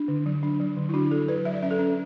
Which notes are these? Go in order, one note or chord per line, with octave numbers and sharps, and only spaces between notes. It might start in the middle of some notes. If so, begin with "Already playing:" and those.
Already playing: D4
D3
F#3
D4
F#3
D3
E4
D4 F#4
F#3 A4
F#3 B4
F#3 E5
D5
C#4 E5
A4
C#4